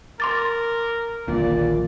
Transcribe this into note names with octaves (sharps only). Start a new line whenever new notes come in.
A#4 C6 D6 A6
D#1 A#1 A#2 D3 D5